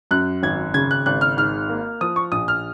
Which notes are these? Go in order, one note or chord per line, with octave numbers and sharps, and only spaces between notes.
F#2 F#6
G#1 G#6
C#3 G#6
F#6
G#1 F#6
F6
G#2 F6
A#3
F3 D#6
C#6
A#1 D#6
F6